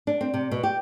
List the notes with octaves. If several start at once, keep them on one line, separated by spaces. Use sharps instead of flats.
D4
C4
C3
B2
G4